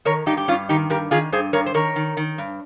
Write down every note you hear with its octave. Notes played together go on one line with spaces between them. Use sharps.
D#3 A#4 C#5
G2 D#4 G4
G4
G2 C#4 F4
D#3 D#4 G4
G2 G4 A#4
D#3 F4 G#4
G2 G#4 C5
G2 A#4 C#5
C5
D#3 A#4 C#5
D#3
D#3
G2